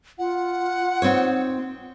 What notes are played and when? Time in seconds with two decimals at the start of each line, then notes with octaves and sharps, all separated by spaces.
0.19 F4 F#5
1.02 C4 D#4 C#5